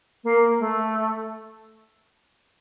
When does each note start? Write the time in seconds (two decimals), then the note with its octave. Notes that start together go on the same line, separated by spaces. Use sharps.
0.24 A#3
0.60 A3